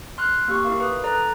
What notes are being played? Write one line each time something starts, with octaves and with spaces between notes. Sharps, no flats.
C6 F6 F#6
A#3 G4 C#6
E4 A#4 F5
B4 D#6
A4 D5 A#5 F#6